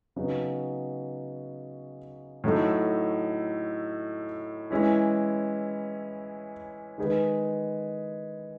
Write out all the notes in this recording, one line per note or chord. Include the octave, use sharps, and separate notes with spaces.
C#3 F#3 B3 D#4
A2 F#3 A3 D#4 A4
E3 G#3 C#4 E4
D#3 G#3 D#4 G#4 B4